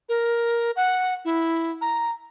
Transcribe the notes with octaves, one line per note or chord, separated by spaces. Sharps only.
A#4
F#5
E4
A#5